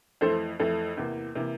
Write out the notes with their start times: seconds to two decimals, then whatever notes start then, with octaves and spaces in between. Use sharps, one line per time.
0.21 F2 E3 A3 A4 C5
0.59 F2 E3 A3 A4
0.97 E2 C3 E3 A#3
1.35 C3 E3 A#3